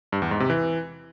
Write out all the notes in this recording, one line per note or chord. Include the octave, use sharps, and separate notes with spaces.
G2
E2
G#2
C3
E3